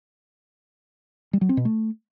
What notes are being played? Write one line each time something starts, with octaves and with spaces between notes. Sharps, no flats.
G3
F#3
C4
B2
A3